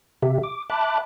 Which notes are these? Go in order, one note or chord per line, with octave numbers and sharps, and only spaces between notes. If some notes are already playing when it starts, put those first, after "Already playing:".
C3 G4 E5
D6
E5 A5 B5 D6 F#6